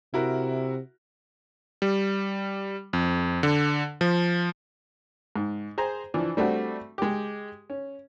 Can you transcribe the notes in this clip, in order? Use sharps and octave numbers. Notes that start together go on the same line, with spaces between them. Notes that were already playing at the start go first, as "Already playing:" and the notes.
C3 E4 F#4 A#4
G3
F2
D3
F3
G#2
G#4 C5 A#5
E3 F3 D4
G3 A3 C4 D4 F#4
G#3 G4
C#4